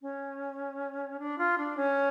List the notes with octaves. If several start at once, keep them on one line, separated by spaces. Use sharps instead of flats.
C#4
D4
F4
D4
C#4